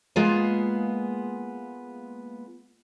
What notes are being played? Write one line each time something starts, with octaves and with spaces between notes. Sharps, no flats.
G#3 A#3 B3 F4 G#4